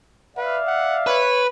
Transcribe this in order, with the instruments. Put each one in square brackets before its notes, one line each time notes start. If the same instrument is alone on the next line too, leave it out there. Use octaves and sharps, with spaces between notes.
[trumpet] B4 [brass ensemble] D5 E5 F5
[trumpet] F#5
[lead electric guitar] B4 [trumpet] C#5